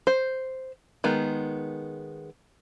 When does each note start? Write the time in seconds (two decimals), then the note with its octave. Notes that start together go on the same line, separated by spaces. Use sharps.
0.07 C5
1.04 D#3 G#3 B3